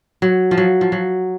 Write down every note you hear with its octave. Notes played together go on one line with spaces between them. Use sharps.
F#3
F3
F#3
F3
F#3